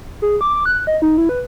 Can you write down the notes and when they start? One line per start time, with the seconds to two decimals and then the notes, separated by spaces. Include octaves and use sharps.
0.22 G#4
0.41 D6
0.66 F#6
0.87 D#5
1.02 D#4
1.18 E4
1.29 B4